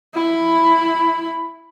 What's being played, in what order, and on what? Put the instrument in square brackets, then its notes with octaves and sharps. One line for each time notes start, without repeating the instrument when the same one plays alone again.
[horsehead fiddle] E4 B5